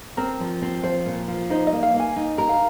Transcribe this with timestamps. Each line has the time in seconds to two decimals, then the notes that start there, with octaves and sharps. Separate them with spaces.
0.17 C4 A#4
0.40 F3
0.62 C4
0.83 F3 C5
1.06 A#2
1.28 F3
1.50 D#4 C5
1.67 D#5
1.73 A#3
1.83 F5
1.94 A#3
2.00 G#5
2.16 D#4
2.38 A#4
2.49 F5